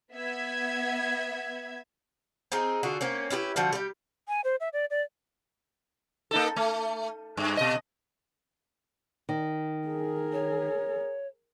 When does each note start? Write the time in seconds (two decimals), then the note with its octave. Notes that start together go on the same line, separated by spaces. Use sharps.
0.14 B3 E5 G#6
2.52 C4 D#4 F4 G#4
2.83 D3 F4 F#4 G#4
3.01 A#3 C4 C#4
3.30 C#4 E4 G4 B4
3.56 D3 F3 G3 F#4
3.73 G3 G4
4.28 G#5
4.44 C5
4.60 E5
4.73 D5
4.90 D5
6.31 A#3 D#4 A4
6.56 A3
7.37 G2
7.57 B2 D#5
9.29 D#3
9.88 G#4 A#4
10.33 C#5